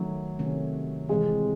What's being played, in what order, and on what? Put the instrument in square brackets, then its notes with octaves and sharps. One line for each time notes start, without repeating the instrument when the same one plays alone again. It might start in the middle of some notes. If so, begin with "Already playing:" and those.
Already playing: [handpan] D#3 A3 C#4 [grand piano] F#3
[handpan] C3 D#3 A3 C#4
[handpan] C3 E3 C4 [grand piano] G#3